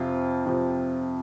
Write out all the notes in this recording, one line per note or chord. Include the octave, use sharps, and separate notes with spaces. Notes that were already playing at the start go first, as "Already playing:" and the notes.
Already playing: F2 C3 F3 F4
F2 C3 F3